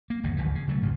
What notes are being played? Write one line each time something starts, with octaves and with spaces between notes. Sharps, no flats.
A#3
G1 E2 C#3
G#1 D2 D#3 E3
C#3
C#3 F#3 A3
A1 D2 G#2